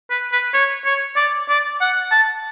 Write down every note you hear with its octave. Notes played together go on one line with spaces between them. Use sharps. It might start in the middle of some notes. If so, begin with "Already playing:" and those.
B4
B4
C#5
C#5
D5
D5
F#5
A5